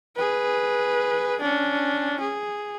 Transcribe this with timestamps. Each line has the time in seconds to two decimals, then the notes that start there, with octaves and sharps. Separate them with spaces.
0.16 G#4 B4
1.41 C#4 D4
2.20 G#4